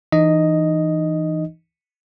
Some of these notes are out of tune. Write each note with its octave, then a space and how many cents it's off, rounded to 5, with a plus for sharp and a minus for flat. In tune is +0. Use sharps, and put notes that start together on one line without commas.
E3 +0 D#4 -25 D#5 +0